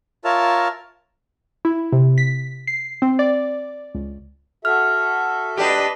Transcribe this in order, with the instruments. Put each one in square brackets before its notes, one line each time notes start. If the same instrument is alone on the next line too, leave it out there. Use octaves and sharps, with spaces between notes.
[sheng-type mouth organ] F4 A#4 C#5 E5 A5 F6
[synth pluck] E4
C3
B6
C7
C4
D5
C#2
[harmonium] F#4 A4 E5 [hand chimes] F6
[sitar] D4 G4 [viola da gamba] B4 D#5